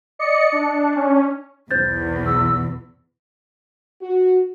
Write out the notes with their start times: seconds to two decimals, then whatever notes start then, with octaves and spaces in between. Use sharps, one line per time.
0.19 D5 D#5 C#7
0.52 D4
0.96 C#4
1.71 B1 E2 C5 G6 A6
2.26 E6
4.02 F#4